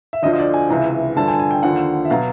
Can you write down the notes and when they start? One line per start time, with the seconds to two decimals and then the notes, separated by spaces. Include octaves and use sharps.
0.13 E5
0.22 D2 D3 F3 D#5
0.33 D#5
0.39 D5
0.54 G#5
0.69 C#2 C3 E3
1.16 G2 D3 F3 A5
1.28 G#5
1.40 G#5
1.51 G5
1.63 D#2 D3 F3 F#5
2.05 E5
2.10 B2 F#3 F5